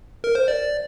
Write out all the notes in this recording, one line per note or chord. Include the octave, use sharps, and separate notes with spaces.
A#4
C5
D5